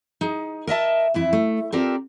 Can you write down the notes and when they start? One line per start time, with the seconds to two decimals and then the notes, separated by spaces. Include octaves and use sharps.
0.21 D#4 G#4
0.67 A#4 D#5 E5 A5
1.14 F2 E3 E4
1.33 A3
1.72 C4 F4 G4 A4 A#4 D5